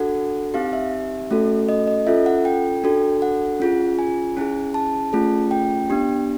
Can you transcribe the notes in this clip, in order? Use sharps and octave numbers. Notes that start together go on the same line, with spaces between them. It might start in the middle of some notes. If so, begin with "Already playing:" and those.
Already playing: D4 F#4 A4 F#5
C4 D#4 G4 F5
E5
A3 C#4 F#4 A4
D#5
D#5
C#4 F4 A4 E5
F#5
G5
D4 F#4 A4
F#5
C#4 F4 G#4
G#5
C#4 E4 G#4
A5
A3 C#4 F4 G#4
G5
B3 D4 G4